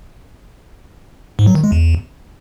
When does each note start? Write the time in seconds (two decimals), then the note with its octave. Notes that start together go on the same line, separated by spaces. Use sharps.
1.39 G#2
1.47 F#3
1.55 D#3
1.64 G#3
1.72 E2